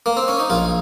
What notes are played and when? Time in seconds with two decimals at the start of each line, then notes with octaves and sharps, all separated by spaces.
0.06 A#3
0.17 C4
0.28 C#4
0.39 D#4
0.50 A#1 F4